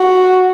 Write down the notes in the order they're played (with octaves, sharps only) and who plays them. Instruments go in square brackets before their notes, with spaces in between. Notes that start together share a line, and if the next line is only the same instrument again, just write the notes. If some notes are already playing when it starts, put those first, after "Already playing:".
Already playing: [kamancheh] F#4